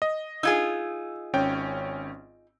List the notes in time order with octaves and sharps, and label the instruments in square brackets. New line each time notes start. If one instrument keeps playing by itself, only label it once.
[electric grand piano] D#5
[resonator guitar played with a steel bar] D#4 F4 G#4 [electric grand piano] E6 G#6
[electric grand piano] G#1 C#4 G5